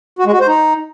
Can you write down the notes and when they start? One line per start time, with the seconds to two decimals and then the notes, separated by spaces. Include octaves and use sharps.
0.19 F#4
0.26 G#3
0.33 F#4
0.40 C5
0.47 D#4